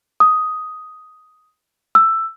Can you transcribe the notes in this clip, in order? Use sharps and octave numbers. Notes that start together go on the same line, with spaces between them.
D#6
E6